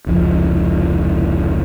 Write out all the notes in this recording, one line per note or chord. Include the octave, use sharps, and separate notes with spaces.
F1 C#2 F3